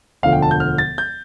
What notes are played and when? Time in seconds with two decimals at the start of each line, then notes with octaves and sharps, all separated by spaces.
0.23 E1 D2 D3 F3 F5
0.33 G5
0.42 A5
0.51 G6
0.60 F6
0.78 A6
0.98 G6